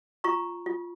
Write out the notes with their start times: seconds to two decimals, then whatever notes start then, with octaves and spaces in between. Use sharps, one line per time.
0.24 F4 A#5 C#6
0.66 F4